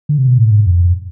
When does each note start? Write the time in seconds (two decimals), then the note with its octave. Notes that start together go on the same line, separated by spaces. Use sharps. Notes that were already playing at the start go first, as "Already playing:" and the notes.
0.09 D3
0.18 C3
0.28 B2
0.38 A2
0.51 G#2
0.67 F2